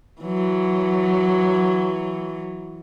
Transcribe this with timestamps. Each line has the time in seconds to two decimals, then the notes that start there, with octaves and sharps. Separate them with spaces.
0.22 E3 F#3